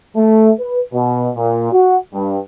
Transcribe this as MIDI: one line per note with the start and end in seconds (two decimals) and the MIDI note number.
0.16 0.50 57
0.60 0.80 71
0.93 1.30 47
1.36 1.70 46
1.72 1.97 66
2.14 2.38 43